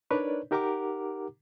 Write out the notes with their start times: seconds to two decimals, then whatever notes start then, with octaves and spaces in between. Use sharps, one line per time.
0.10 D4 D#4 A#4 B4 C#5 D5
0.51 D#4 G4 A#4 F#5 A#5 D6